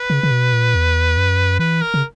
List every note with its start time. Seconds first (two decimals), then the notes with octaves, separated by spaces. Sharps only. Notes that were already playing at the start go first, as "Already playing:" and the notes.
Already playing: B4
0.10 C#3
0.23 C#3
0.31 B2
0.53 A#2
0.74 E2
1.17 F#2
1.59 E3 B4
1.81 A#4
1.94 C#3